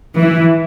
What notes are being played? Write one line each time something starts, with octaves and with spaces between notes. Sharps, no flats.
E3